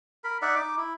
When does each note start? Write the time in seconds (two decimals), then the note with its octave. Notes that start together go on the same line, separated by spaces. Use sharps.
0.24 A#4 B5
0.42 D#4 D5 E5 F#5
0.56 D#4 D6
0.77 E4